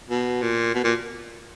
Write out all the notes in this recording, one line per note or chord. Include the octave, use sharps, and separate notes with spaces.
B2
A#2
B2
A#2